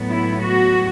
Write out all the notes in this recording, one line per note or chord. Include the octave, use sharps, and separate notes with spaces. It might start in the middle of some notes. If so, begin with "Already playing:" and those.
Already playing: A2 F#3 B3
E4
F#4